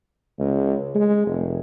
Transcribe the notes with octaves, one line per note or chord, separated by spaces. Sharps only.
C#2
G#3
F1